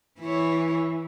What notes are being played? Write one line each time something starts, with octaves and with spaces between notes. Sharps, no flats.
E3 E4 C#5